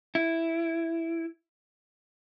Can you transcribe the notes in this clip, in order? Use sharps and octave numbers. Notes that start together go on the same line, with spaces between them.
E4